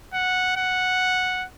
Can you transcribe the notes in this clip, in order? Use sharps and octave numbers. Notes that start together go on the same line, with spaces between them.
F#5
F#5